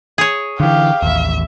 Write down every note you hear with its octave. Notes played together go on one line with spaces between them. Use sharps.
G#4 C#5
D3 E3 G4 F5
A1 D#2 E5